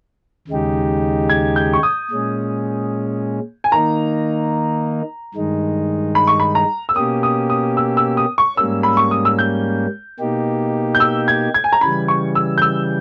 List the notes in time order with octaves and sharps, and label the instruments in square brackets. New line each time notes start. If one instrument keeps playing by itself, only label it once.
[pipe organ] D#2 C#3 G#3 D#4 G4
[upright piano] G#6
G6
C#6
D#6
[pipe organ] A#2 G#3 C#4
[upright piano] G#5
[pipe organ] D#3 A#3 D#4 [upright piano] A#5
[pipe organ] G2 D#3 G#3 D#4
[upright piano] B5
C#6
B5
A#5
E6
[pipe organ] B2 A#3 C#4 G4 [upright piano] D#6
[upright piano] D#6
D#6
E6
E6
D#6
C#6
[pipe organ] G#2 G3 A#3 C#4 [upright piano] E6
[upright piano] B5
C#6
D#6
E6
G6
[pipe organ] B2 A#3 D#4 G4
[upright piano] G6
E6
G#6
G#6
G#5
A#5
[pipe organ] C#3 E3 G3 [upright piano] B5
[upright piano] C#6
E6
G6
E6